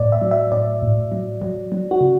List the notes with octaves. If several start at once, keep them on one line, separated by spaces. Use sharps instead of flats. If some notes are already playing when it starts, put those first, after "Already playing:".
Already playing: A2 D5
E5
F#3
E5
A2 D5
A2
F#3
F#3
F#3
F#4
C#3